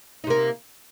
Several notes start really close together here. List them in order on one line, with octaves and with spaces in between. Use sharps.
D#4 C3 A#3